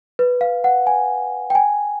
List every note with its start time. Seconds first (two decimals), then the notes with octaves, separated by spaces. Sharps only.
0.19 B4
0.41 F5
0.64 F#5
0.87 G#5
1.50 G5
1.55 G#5